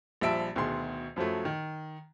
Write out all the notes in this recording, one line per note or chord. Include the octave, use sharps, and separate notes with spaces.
A#1 F3 G3 E5 A5 D7
D2 B2 D#3 G#4 C6
F#2 F3 F#3 A3
D#3